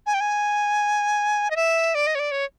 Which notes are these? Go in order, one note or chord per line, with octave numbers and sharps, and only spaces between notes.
G#5
G5
G#5
D#5
E5
D5
D#5
C#5
D5
C#5